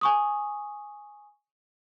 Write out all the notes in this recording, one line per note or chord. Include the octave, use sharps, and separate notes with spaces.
G#5 C#6 D#6